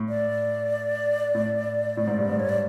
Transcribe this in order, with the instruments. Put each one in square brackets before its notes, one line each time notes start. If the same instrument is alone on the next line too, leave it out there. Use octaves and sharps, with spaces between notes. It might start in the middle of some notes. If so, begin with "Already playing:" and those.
Already playing: [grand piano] A2
[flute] D5
[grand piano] A2
A2
G#2
G2
G#2
[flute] C#5
D5